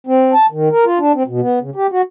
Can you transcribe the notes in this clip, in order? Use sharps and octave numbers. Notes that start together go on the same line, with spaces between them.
C4
A5
D#3
A#4
F4
D4
C4
B2
B3
C#3
G4
F#4